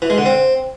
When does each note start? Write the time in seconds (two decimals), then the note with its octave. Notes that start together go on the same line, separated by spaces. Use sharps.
0.02 E3
0.10 G#3
0.18 D3
0.26 C4